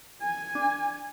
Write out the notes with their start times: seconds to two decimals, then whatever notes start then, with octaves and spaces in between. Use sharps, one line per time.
0.22 G#5
0.55 D4